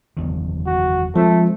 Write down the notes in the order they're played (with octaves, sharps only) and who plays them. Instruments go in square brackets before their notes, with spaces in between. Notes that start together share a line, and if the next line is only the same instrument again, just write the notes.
[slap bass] F#1 E2 D#3
[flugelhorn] F#4
[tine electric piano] F3 [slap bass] G#3 C4 [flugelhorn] A3